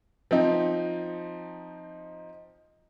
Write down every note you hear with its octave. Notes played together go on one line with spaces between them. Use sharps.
F3 C4 D#4